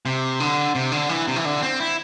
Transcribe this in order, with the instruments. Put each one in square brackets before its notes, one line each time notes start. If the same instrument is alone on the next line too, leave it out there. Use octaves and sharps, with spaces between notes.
[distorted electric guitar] C3
D3
C3
D3
E3
C3
E3
D3
C4
E4